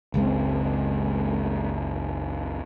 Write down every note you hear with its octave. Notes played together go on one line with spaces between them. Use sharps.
F#1 C#2 G#3 C4